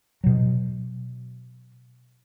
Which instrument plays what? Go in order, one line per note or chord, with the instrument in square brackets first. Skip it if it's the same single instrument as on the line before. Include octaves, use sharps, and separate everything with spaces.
[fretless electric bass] B2 F#3